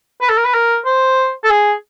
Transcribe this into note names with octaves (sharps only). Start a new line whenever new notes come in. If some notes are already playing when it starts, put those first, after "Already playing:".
B4
A4
A#4
B4
A#4
C5
A4
G#4